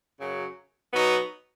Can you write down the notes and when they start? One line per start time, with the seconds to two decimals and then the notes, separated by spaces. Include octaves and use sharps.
0.19 F#2 C#3 F#3
0.92 B2 F#3 B3 D#4